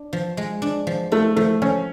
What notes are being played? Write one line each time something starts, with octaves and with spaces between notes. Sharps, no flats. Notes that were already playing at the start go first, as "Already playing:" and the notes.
Already playing: D4
F3
G#3
D4
F3
A3 F4
F3 A3
F3 C#4